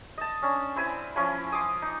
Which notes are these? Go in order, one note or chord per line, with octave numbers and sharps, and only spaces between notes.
D#5 A5
C#4 D4
C4 E4 G#5 B5
F3 C#4 E4 G#5
C6 D6 D#6
D#4